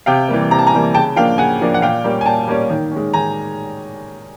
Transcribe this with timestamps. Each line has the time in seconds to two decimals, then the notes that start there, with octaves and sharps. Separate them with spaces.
0.06 C3 F5 G5
0.29 E3 G3 A#3
0.51 C3 A#5
0.59 A5
0.67 G#5 A#5
0.73 E3 G3 A#3
0.95 C#3 G5 A5
1.16 F3 A#3 D4 F5 G5
1.38 C#3 F#5 G#5
1.61 F3 A#3 D4
1.74 F#5
1.82 A#2 F5 G5
2.04 G3 A#3 C#4
2.21 G#5
2.26 A#2 G5 A5
2.48 G3 A#3 C#4
2.70 D#3
2.92 G#3 C#4
3.14 D#3 G#5 A#5